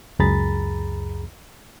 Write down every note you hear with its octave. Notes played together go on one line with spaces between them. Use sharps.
C#2 F#2 G#4 A#5 B5 A6